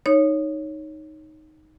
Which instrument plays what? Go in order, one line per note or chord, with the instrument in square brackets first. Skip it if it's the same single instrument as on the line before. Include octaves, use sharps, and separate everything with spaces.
[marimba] D#4 C#5